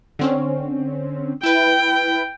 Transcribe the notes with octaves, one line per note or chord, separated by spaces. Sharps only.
D3 C4 C#4
E4 B4 G5